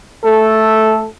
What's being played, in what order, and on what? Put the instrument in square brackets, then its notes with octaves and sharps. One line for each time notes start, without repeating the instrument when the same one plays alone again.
[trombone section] A3 A4